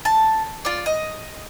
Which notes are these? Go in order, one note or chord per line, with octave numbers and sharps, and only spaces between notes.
A5
F4 D5
D#5